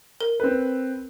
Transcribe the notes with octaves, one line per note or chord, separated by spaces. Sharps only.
A#4
C4 B4